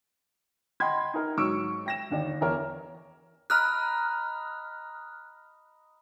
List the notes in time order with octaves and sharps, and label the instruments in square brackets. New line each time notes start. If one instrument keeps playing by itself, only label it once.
[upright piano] D#5 F#5 G5 B5 C6 G#6
D#4 A#4
G#2 F#3 C#6 E6 D7
G5 A#6 E7
G1 D#2 D5
E2 A#4 C#5
[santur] D#5 A#5 B5 [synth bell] F6 F#6